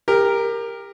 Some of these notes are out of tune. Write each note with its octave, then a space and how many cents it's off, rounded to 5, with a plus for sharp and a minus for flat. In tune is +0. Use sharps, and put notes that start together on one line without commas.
G4 +25 A#4 +0